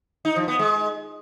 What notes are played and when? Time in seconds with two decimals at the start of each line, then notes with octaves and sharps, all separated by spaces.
0.25 D#4
0.36 F3
0.48 B3
0.59 G#3